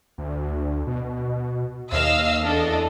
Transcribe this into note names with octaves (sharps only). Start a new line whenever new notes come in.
D2
B2
D#2 D#5 F5 E6
E2 D4 A4 D#5